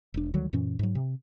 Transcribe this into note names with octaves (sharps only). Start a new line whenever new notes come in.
E1 D4
D2 D#3 F#3 G3
F#2 A#2 E3 C#4
G#2 F#3
C3